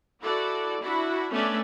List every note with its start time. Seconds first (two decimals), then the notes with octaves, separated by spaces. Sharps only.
0.21 E4 F#4 A4 D5
0.81 D4 E4 F#4 B5
1.32 A3 B3 C#4 D4 D5 E5